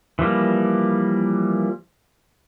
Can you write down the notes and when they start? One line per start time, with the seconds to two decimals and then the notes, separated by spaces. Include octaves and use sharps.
0.19 E3 F3 G3 A#3